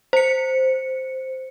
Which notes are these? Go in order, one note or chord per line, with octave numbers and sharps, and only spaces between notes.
C5 C#7